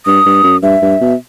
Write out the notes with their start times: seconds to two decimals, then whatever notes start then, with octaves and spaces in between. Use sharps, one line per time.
0.06 G2 D#6
0.26 G2
0.43 F#2
0.63 G2 E5
0.82 G2
1.01 B2